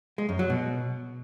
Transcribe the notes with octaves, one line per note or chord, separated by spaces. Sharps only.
G#3
F#2
F#3
B2